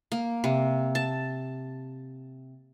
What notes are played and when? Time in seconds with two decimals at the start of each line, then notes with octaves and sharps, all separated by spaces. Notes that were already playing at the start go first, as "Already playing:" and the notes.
0.12 A#3
0.44 C3
0.95 A5